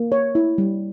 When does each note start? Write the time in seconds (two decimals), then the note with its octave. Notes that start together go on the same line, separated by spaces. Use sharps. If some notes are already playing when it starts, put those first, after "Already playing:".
Already playing: A#3
0.12 C#5
0.35 E4
0.58 G3